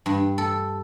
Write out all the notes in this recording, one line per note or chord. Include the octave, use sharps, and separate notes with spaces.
G2
A4